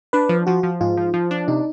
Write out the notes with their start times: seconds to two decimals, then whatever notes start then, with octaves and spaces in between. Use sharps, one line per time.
0.13 D4 B4
0.29 F3
0.47 F3 F#4
0.63 F3
0.81 G#2 F4
0.97 F3
1.14 F3
1.31 D4
1.48 C3 D#4